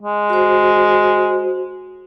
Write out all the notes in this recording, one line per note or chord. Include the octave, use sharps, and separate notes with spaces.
G#3
F#4 C5